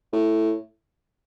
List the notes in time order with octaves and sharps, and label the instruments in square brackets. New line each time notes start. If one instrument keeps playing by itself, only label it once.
[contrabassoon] A2